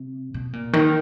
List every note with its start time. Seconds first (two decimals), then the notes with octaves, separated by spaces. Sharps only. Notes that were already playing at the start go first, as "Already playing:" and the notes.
Already playing: C3
0.34 B2
0.53 A#2
0.73 D#3